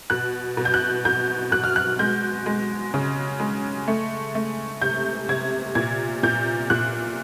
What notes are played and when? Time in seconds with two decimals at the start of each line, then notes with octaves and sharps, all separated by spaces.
0.10 B2 F#6
0.57 B2
0.65 G6
0.74 F#6
1.05 B2 G6
1.52 B2 F#6
1.64 F6
1.76 F#6
1.99 G#3 G6
2.46 G#3
2.94 C#3
3.40 G#3
3.88 A3
4.35 A3
4.81 C3 G6
5.29 C3 G#6
5.75 A#2 G#6
6.23 A#2 G6
6.70 A#2 F#6